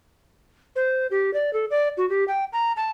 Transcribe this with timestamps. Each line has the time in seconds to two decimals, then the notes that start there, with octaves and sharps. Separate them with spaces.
0.76 C5
1.11 G4
1.33 D5
1.53 A4
1.70 D5
1.97 F#4
2.09 G4
2.28 G5
2.53 A#5
2.76 A5